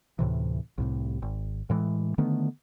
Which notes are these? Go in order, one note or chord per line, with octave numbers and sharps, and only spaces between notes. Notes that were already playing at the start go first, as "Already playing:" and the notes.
D2 A2 C3 E3
C2 A2 C3
G#1
A2 E3 G#3
D3 D#3 A3 B3